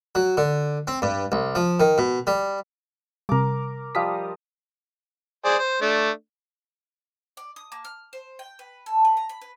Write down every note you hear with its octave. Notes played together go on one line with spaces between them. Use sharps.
F#3
D3
C4
G2
C2
F3
D#3
B2
G3
C3 G3 A#4 D6
F3 G3 D#5 F5 B6
G#4 C5 D5
C5
A3 D4
D5
D#6
A#3
F6
C5
G5
B4
A4
B4
A#5
B5
B4